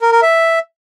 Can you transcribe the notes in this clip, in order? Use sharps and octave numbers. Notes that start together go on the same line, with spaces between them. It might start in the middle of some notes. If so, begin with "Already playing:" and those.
A#4
A#4
E5